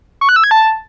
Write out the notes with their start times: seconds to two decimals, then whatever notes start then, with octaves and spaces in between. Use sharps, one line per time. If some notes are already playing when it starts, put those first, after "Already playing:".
0.21 C#6
0.29 F#6
0.36 E6
0.44 G#6
0.51 A5